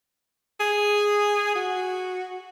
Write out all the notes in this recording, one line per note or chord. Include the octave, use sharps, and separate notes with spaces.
G#4
F#4